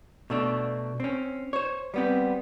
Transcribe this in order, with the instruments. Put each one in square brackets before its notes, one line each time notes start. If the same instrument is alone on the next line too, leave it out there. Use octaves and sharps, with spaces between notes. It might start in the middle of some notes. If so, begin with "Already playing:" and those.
[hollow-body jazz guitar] B2 A3 D4
C4 C#4
C5 C#5
G3 B3 C4